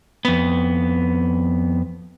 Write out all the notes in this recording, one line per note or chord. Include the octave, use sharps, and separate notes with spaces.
F2 B3